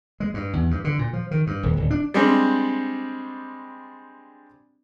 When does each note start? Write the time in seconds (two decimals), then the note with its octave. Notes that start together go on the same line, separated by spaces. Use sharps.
0.20 G#3
0.34 G2
0.53 E2
0.71 G2
0.84 D3
0.99 A#2
1.13 F3
1.31 D#3
1.47 G2
1.63 D#1
1.77 D1
1.91 D4
2.14 G3 G#3 C4 D4